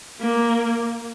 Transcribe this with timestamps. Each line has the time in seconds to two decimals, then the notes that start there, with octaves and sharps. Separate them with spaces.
0.21 A#3